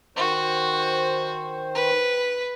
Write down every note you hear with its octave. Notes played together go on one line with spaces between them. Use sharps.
D#3 F#4 C5
B4